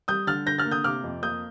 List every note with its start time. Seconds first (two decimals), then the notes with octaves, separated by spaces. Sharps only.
0.08 G3 D#6 G6
0.27 D3 F6 A6
0.46 D3 G6 A#6
0.58 F6 A6
0.65 A#3
0.71 D#6 G6
0.84 C3 D6 F6
1.04 F2
1.22 A#3 D#6 G6